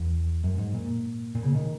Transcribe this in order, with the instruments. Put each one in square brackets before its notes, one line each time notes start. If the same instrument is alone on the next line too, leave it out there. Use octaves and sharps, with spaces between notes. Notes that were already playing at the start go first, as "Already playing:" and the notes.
Already playing: [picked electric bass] E2
F#2
G#2
A#2
A#2
C#3
D#3